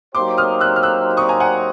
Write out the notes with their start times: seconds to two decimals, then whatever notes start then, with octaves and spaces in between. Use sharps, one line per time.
0.15 F#3 A#3 D#4 G4 C5 C6 D6
0.38 D#6 F6
0.60 E6 F#6
0.76 F6
0.83 E6 F#6
1.17 C#6 D#6
1.29 G#5 A#5
1.40 F#5 G#5